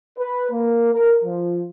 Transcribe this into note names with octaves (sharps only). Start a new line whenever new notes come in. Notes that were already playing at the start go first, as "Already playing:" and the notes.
B4
A#3
A#4
F3